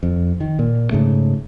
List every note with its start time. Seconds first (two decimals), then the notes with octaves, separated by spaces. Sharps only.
0.03 F2
0.41 D#3
0.59 A#2
0.91 G#2 C#3 A3